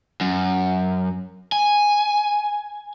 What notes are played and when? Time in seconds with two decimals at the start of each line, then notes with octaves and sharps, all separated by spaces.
0.21 F#2
1.52 G#5